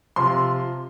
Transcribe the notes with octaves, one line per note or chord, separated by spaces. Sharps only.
C3 F3 C6